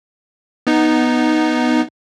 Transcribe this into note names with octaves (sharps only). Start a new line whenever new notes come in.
B3 D#4